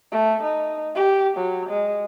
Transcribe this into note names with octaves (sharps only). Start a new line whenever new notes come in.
A3
D#4
G4
F#3
G#3